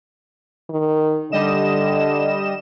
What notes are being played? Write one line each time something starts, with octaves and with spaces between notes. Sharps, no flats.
D#3
D3 G3 D#5 E7